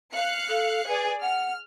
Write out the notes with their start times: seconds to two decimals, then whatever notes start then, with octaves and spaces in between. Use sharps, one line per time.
0.13 F5 F#6 C#7
0.48 A4
0.87 G#4 B4 D5
1.21 F#5 F6